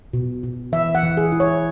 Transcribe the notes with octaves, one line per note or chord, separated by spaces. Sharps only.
B2
B2
E3 E5
F#5
E3
G#4
E4
C#5